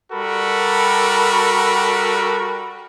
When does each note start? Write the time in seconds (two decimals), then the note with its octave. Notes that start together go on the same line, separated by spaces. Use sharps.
0.12 G3 F#4 A4 A#4 B5